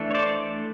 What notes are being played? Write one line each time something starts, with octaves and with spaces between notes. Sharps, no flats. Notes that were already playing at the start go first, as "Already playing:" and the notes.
Already playing: E3 A3 D4
C#5
C5 D5